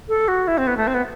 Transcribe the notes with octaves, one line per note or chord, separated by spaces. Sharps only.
A4
F#4
E4
C4
B3
A3
C4
B3